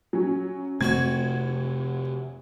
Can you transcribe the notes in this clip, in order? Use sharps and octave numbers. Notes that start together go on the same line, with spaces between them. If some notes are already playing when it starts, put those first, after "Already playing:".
F#3 C#4
F2 C3 A3 C4 F#4 C#6 G#6